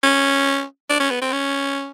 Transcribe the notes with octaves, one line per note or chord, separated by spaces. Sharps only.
C#4
D4
C#4
B3
C4
C#4